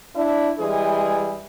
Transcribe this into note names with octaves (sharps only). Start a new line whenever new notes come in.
D4 E4
E3 G3 G#3 G#4